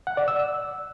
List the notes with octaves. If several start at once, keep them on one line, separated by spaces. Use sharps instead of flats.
F#5
D5
E6